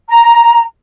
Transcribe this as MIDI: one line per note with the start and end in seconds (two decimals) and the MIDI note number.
0.08 0.63 82